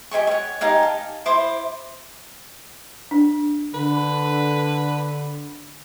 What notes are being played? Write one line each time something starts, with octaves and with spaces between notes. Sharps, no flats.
G4 D#5 G#5 C#6
C#5 F#5
D#4 G4 F5 G#5
A5
E4 C5 C6 D6
D4
D3 B4